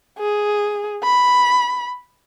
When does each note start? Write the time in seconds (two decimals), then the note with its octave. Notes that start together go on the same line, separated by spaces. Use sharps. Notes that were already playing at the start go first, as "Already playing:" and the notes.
0.19 G#4
1.03 B5